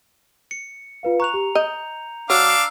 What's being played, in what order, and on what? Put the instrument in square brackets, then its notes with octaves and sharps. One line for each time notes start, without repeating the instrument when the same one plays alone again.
[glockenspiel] C#7
[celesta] F4 B4 F5
[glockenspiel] A#5 F7 [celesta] C#6 F#6
[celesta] G4
[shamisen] D#5 [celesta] G6
[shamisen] F#3 C#5 [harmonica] D4 F5 D6 [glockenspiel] E6